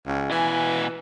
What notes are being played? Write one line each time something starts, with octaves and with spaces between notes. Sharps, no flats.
C#2
B2 E3 G#5